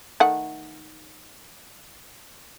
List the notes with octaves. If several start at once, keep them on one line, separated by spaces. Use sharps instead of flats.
D#3 A3 F#5